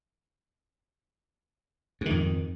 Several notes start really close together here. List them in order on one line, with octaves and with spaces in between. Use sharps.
G#2 D#3 F2